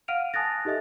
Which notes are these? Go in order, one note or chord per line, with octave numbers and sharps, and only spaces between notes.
F5 F#5 F6 D7 D#7 F7
G#5 A5 D#6 F#6 A6 A#6
D#4 G4 A4 D#5 E5 A6